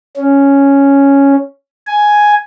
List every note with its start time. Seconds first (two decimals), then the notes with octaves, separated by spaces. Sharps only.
0.16 C#4
1.87 G#5